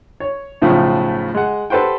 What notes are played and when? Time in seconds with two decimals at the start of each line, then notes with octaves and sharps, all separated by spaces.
0.20 C#5
0.62 B1 A2 C#3 F3 A3
1.34 G#3 F#5
1.70 G4 A4 B4 C5 F#5 G5